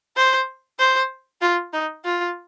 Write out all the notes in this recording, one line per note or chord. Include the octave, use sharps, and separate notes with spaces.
C5
C5
F4
D#4
F4